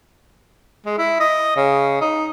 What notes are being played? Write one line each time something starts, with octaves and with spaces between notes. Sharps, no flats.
G#3
E4
D#5
C#3
D#4